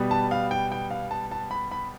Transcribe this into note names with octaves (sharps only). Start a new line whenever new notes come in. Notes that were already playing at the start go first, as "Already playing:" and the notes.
Already playing: B2 G3 B3
A5
F5
G5
G5
F5
A5
A5
B5
B5